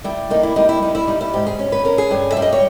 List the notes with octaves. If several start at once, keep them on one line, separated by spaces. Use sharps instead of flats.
G3 E4
A#3 D#4
E4
G3 D#4
E4
G3 D#4
E4
G3 D#4
E4
G#2 G4
G#4
C#4
B4
C#4 A#4
G#4
G2
E5
G3
D#5
C#5